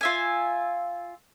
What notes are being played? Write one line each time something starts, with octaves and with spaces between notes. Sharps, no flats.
F4 E5 G#5